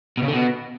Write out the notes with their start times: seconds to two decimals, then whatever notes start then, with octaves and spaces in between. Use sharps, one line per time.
0.18 B2
0.23 C#3
0.28 D3
0.34 B2